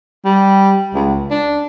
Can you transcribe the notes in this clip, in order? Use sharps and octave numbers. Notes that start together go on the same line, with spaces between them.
G3
C#2
D4